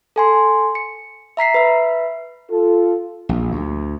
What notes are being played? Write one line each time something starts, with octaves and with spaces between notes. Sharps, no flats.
A4 G#5 C6
C#7
E5 A#5 B6 C7
B4 E5
F4 A4
A#1
D2